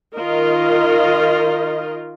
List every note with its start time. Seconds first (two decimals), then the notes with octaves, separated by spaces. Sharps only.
0.16 D#3 F4 A#4 D#5